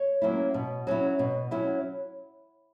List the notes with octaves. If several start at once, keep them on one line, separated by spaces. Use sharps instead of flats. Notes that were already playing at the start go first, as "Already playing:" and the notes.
Already playing: C#5
F#3 A#3 C#4 E4
B2
F#3 C#4 E4
B2
F#3 C#4 E4